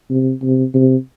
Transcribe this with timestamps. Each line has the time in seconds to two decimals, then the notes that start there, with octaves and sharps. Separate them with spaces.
0.11 C3
0.43 C3
0.74 C3